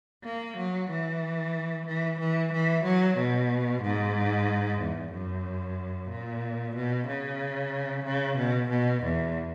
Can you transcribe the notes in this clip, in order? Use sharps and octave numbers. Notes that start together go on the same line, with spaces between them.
A#3
F#3
E3
E3
E3
E3
F#3
B2
G#2
E2
F#2
A#2
B2
C#3
C#3
B2
B2
E2